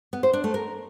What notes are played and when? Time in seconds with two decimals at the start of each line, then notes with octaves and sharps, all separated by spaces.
0.13 B3
0.23 C5
0.33 D4
0.44 A3
0.54 A#4